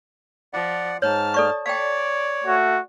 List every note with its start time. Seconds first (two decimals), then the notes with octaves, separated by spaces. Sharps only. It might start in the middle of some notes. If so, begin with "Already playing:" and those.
0.53 F3 D5 F#5
1.02 G#2 C#5 A5 F6
1.34 A4 D5 C#6
1.66 C#5 D5 F5 G5
2.45 A3 F#4